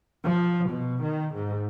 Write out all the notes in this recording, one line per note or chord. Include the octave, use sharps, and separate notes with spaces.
F3
B2
D#3
G#2